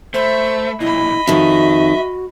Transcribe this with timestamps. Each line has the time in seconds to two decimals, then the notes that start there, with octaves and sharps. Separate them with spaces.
0.14 A3 C5 E5 B5
0.80 B1 A#2 E4 D#5 B5
1.27 F2 D#3 F#4 E5